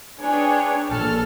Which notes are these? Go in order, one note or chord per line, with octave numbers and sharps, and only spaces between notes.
D4 G#4 B4 C#5 G5
A#1 A4 A5 F6